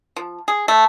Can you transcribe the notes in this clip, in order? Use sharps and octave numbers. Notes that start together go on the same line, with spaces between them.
F3
G#4
A3